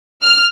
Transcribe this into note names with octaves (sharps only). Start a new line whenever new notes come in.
F6